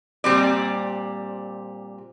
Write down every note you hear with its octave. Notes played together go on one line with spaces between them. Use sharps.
A#2 G3 C4 D5